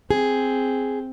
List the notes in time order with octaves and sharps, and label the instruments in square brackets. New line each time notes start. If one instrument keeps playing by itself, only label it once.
[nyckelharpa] C4 [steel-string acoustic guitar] G#4